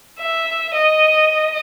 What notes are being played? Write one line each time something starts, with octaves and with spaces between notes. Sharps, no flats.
E5
D#5